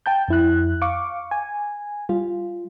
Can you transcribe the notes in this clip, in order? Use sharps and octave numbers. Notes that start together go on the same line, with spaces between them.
G5 A5 G6
F2 E4 F#6
F5 C#6 D6
G#5
G3 F4